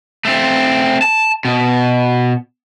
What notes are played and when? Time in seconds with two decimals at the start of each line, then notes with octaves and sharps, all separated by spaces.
0.25 A3 C4
1.02 A5
1.45 B2